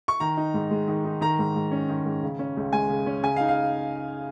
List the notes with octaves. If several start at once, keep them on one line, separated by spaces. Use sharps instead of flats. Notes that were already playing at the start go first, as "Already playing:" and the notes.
C#6
D#3 A#5
D#4
G#2
G#3
D#3
D#4
D#3 A#5
G#2
G#2
C#4
D#3
G#2
C#3
C#4
C#2
G#3 G#5
C#3
C#4
C#3 G#5
F5
D#4
F5